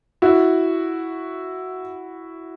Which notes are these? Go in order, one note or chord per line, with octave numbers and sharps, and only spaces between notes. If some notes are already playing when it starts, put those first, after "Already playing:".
E4 F#4